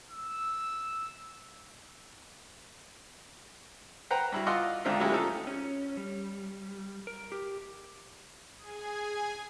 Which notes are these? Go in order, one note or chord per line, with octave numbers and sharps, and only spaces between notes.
E6
B4 C5 F#5 G5 A#5
G2 E4 F#4
F4 D#5 F#5 C6 D6 E6
G#2 D3 D#3 C4 F4 E5
F#3 G#3 A3 C#4 E4 G4
F3 D#4 A4
C#4
G3
A#4
G4
G#4 G#5